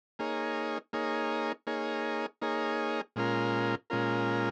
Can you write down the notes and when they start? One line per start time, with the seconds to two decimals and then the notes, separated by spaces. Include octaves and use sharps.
0.19 A#3 D#4 G#4 C#5
0.93 A#3 D#4 G#4 C#5
1.67 A#3 D#4 G#4 C#5
2.42 A#3 D#4 G#4 C#5
3.16 A#2 G#3 C#4 F4 A#4
3.90 A#2 G#3 C#4 F4 A#4